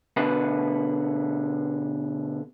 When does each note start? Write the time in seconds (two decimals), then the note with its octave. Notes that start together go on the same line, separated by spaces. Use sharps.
0.17 B2 D3 B4